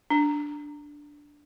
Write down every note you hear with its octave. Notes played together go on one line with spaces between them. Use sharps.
D4